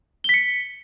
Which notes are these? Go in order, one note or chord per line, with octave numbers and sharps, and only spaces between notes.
B6 C#7 G7